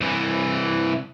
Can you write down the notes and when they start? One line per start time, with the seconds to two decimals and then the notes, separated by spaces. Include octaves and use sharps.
0.01 C2 E3